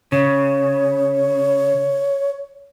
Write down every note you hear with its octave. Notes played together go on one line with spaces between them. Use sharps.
C#3 C#5